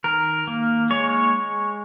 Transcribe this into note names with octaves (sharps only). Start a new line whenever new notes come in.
D#3 A#4
A#3
G#3 C#5